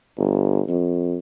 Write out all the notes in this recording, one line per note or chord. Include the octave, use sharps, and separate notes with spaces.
G1
F2